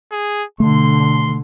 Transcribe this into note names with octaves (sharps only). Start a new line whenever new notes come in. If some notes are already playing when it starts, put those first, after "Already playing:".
G#4
B2 D3 A3 C6